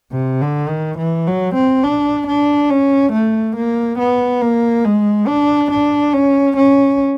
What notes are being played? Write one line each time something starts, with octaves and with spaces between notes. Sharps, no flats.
C3
D3
D#3
E3
F#3
C4
D4
D4
C#4
A3
A#3
B3
A#3
G#3
D4
D4
C#4
C#4